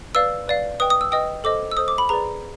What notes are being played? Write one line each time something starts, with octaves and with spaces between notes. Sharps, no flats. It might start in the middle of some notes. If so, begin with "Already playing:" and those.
B4 D5 F5 E6
B4 D5 F5
B4 D#5 G5 D#6
D#6
E6
B4 D#5 G5 D#6
A4 C5 D#5 D6
E6
A4 C5 D#5 D#6
D6
B5
G#4 B4 D5 A#5